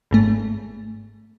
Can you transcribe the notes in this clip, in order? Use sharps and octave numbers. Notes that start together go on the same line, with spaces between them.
G#1 G#2 A3